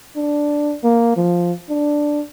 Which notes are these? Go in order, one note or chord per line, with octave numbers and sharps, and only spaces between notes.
D4
A#3
F3
D4